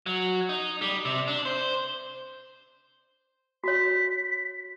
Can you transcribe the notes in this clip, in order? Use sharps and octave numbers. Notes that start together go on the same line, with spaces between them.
F#3
D#4
G3
C3
D4
C5
F#4 C#5 B6